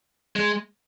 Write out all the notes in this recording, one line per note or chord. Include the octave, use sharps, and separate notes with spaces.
G#3